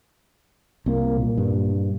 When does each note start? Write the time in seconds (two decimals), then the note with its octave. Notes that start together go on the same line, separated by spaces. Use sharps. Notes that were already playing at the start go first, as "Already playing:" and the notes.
0.86 C2 A#3
1.18 A#2
1.37 G2